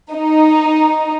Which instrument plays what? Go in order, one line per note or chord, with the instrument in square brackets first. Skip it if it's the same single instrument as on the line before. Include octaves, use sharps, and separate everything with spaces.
[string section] D#4